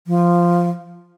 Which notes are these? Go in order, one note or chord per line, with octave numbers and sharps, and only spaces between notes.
F3